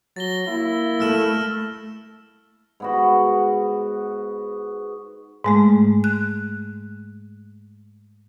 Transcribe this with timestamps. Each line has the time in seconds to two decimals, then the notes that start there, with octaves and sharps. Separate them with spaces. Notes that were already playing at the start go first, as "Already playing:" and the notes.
0.16 F#3 A6 A#6 G7
0.48 A#3 E4
1.00 A3 E6 F6 E7
2.80 G#2 B3 F#4
5.44 G#2 G#3 A3
6.04 F#6